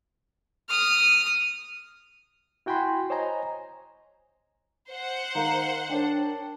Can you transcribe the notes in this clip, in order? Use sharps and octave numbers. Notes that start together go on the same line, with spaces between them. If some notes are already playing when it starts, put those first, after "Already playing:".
D#6 F6
E4 F#4 G5 G#5 B5 C6
C5 C#5 D#5 G#5 A#5
C5 F#5
D#3 A#4 F5 A#5
D4 A#4 C#5 G5